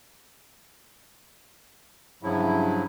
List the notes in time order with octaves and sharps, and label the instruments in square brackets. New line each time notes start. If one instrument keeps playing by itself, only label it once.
[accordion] G2 C#3 F3 F#3 E4